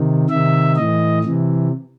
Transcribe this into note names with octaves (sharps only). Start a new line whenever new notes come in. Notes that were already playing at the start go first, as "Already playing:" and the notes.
Already playing: C3 D#3
C3 D#3 E5
A2 E3 D#5
C3 E3